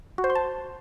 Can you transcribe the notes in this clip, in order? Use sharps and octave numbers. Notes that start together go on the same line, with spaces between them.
F#4
C5
C6
A5